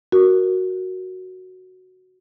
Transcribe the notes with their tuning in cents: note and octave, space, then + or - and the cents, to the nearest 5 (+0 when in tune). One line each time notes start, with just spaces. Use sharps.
F#4 +0 A#4 +0